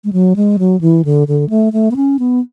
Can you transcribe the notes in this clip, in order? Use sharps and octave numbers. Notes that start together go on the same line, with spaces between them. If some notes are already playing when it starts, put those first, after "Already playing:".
G#3
F#3
G#3
F#3
E3
D3
D3
A3
A3
B3
C#4
B3